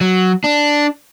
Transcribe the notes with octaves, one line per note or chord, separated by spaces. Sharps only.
F#3
D4